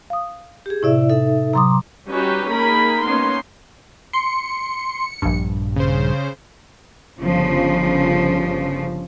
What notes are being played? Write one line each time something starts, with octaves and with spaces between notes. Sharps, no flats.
F5 D#6
G4 G#4
A2 C3 E4 D5 E5
D#4 A4 E5
C3 F#3 A#5 C6 D6 D#6
G3 C#4 D#4 F#4 G4 B4
A#3 D#4 G#4 A#4 B5
A#3 B3 C#4 D#4 C6
C6 C#7
A#1 G2
C#3 C5
G1 C#3 F3